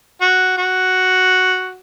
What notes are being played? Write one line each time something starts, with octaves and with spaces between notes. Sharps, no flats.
F#4
F#4